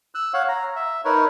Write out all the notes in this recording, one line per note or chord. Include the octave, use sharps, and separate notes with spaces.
E6 F#6
C#5 F5 F#5
A#5
E5
D#4 A#4 B4 C#5